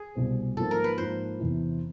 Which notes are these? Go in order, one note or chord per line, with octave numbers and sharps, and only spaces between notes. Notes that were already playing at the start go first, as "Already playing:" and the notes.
Already playing: G#4
C2 B2 G3 C4
G#2 F3 A#3 A4
A#4
B4
G#2 F3 A#3 C5
E2 C3 E3